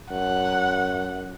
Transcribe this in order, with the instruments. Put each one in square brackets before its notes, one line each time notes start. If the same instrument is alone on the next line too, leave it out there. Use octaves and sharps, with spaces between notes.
[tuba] F#2 [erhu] F#5